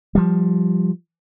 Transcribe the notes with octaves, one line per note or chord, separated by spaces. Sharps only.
F3 G3